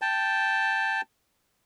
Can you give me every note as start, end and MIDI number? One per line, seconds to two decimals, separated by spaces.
0.02 1.01 79
0.02 1.01 81